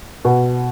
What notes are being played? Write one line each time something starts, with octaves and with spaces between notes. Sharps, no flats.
B2